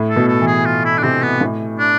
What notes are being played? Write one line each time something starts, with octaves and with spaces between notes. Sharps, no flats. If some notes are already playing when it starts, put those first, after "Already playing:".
Already playing: A2
A4
B2
A4
E3
G#4
F4
E4
D4
C3 C4
B3
A2
D4